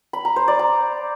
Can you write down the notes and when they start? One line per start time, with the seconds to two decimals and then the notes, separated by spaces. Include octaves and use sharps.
0.13 B5
0.25 A#5
0.36 C5
0.48 D5
0.59 A#5